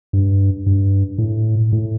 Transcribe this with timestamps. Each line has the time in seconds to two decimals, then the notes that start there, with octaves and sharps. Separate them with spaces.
0.13 G2
0.66 G2
1.18 A2
1.72 A2